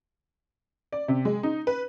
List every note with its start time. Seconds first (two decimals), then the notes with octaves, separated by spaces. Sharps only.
0.92 D5
1.08 C3
1.25 G#3
1.43 D#4
1.67 B4